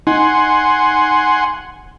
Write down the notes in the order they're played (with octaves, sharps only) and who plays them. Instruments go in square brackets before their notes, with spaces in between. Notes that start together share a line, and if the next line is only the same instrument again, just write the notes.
[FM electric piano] D#4 [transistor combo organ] F#5 G#5 C6